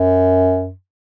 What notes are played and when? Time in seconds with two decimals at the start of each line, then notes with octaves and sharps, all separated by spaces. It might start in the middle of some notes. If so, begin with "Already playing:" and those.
Already playing: F#2